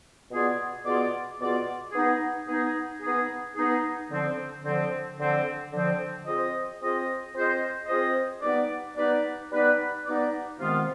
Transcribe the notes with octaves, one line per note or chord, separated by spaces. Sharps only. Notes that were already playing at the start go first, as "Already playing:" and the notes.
B2 B3 F4 G#4 D5
B2 B3 F4 G#4 D5
B2 B3 F4 G#4 D5
B3 D#4 G#4
B3 D#4 G#4
B3 D#4 G#4
B3 D#4 G#4
D3 F3 C4
D3 F3 C4
D3 F3 C4
D3 F3 C4
C4 F4 G#4 C5 D#5
C4 F4 G#4 C5 D#5
C4 F4 G#4 C5 D#5
C4 F4 G#4 C5 D#5
G3 B3 D#4 B4 D5
G3 B3 D#4 B4 D5
G3 B3 D#4 B4 D5
G3 B3 D#4 B4 D5
C3 D#3 G#3 B3 F4